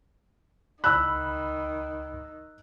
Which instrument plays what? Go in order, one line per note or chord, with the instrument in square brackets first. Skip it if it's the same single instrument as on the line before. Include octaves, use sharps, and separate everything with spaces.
[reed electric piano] C#2 B5 [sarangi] D#3 [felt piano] E6 F#6